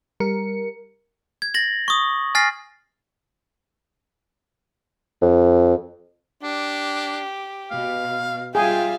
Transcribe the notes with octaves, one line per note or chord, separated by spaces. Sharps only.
G3 A#4 C#7
G#6
A6 A#6 F#7
C#6 D#6
G#5 F6 A6 A#6 C7
F2
D4 G4
B2 F5
G3 F4 G#4 E5 F5 G5